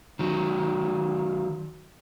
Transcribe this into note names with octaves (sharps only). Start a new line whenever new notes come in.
D#3 F#3